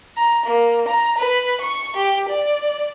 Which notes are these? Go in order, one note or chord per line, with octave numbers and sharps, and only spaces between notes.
A#5
A#3
A#5
B4
C#6
G4
D5